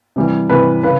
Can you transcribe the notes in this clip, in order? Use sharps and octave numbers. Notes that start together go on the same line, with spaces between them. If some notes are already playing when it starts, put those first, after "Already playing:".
C3 E3 G3
C3 E3 G3 B4
C#3 B4